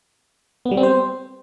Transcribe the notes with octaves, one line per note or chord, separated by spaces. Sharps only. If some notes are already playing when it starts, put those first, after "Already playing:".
B3
G3
C4
C5